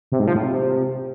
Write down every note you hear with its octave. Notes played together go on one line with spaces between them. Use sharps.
C3
G#2
F3
A2
C3